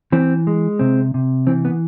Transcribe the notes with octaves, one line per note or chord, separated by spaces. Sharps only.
E3 C4
G#3
C3 C4
C3
E3 C4
B3